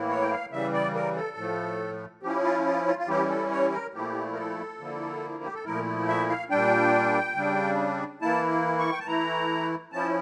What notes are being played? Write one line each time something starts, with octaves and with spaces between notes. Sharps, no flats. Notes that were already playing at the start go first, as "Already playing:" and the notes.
Already playing: A2 E3 A#3 E4
C#5
G5
F5
C#3 E3 G3 E5
D5
A#4
A4
A2 F3 A3
F3 C#4 E4 G4
F4
F4
F4
F4
E3 G3 C#4 E4 G4
A4
C#5
A#4
A#2 F3 A3 E4 G4
A#4
A4
D3 F3 A#3 E4
G4
A4
A#2 F3 A3 E4 A#4
E5
F5
A#2 G3 D4 G5
C#3 G3 D4
E3 A#3 E4 A5
C#6
G5
A5
E3 A3 E4 A#5
F3 C#4 E4 A5